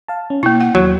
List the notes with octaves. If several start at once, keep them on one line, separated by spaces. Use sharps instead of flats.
F5 A5
C#4
B2 A#3 E4
F#5
D#2 F#3